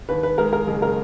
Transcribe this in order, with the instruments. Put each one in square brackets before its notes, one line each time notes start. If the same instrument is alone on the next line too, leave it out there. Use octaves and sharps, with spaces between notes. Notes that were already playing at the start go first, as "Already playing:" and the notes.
[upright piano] D#2 [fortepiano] B4
[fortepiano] B4
[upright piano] G#3 [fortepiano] A#4
[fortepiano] A#4
[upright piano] F#1 [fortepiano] G#4
[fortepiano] A#4